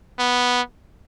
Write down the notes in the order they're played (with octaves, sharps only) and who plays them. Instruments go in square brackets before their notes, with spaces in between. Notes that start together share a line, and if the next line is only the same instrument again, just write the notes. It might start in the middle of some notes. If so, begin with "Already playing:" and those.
[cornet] B3